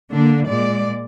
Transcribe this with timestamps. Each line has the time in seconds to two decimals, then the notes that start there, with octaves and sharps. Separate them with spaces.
0.12 D3 A#3 D4
0.47 A#2 G#3 D5